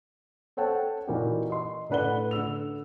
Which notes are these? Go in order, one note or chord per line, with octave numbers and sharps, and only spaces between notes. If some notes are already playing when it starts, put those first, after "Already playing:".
A4 C5 C#5 F#5 G5 A5
A#2 E3 A#3 D#4 F#4 G4
D#5 C6
A2 D4 B4 F#5 G7
D3 E6 F7